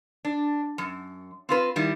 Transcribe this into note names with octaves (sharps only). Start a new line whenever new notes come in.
D4
F#2
C4 F4 B4
D#3 G3 E4